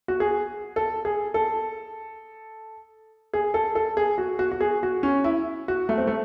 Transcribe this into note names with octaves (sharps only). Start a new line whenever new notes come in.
F#4
G#4
A4
G#4
A4
G#4
A4
A4
G#4
F#4
F#4
F#4
G#4
F#4
C#4
E4
F#4
A3
C4
A3